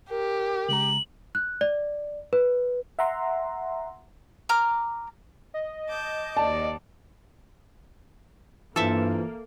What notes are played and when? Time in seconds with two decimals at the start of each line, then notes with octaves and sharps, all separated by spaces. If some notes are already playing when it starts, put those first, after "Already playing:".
0.10 G4 A#4
0.69 C#3 G#3 A#5 F#7
1.35 F#6
1.61 D5
2.33 B4
2.99 E5 F#5 A#5 C6
4.49 A#5 D6 F6
5.54 D#5
5.88 A5 D6 G6
6.37 D#2 D5 A5
8.76 G2 E3 A#3 F4 A4 C5 E5